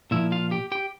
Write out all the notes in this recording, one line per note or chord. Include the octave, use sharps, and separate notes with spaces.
A#2 F3 E4 E5
F4 F5
G4 G5
G4 G5